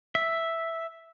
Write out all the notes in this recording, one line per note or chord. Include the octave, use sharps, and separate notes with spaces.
E5